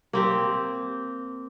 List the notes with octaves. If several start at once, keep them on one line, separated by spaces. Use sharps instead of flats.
A#3 C4 G4